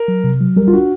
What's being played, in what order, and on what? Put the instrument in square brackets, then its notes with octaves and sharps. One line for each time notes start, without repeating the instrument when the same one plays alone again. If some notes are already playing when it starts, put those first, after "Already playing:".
Already playing: [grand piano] A#4
[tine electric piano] F#3
C3
F#3
[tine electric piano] G3 [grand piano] A#4
[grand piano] F4
[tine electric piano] D4 [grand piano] F#4